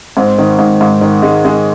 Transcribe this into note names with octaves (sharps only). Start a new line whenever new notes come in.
G#2 C4
D#3
G#2
G#2
D#3
G#3
G#3